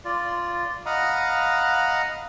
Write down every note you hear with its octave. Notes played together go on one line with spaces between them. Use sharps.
F4 D5
D#5 F5 F#5 A#5 B5 D#6